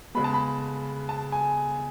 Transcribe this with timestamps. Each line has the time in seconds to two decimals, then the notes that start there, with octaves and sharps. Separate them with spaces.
0.15 C#3 G#3 B3 B5
0.24 A5
0.34 B5
1.09 A5
1.32 G#5